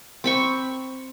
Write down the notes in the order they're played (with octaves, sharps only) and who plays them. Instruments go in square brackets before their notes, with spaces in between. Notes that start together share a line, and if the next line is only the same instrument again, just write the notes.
[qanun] C4 B5 C#6